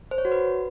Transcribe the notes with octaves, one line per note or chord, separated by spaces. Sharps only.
C5
C#5
F#4
B4